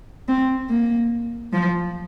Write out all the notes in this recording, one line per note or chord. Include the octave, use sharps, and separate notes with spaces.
C4
A#3
F3